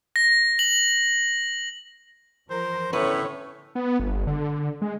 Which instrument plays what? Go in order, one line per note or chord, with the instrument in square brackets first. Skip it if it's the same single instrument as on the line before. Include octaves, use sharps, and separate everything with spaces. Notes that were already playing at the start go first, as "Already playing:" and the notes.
[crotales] A#6
F#7
[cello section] E3 F3 A#4 [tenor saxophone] C5
[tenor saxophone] A2 [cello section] D3 C#4 C#5 [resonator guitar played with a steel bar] B3 B4
[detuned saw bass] B3
G1
D3
G#3